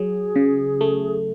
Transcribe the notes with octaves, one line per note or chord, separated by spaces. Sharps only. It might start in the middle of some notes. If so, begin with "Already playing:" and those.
Already playing: F#3 G#4
C#3
A3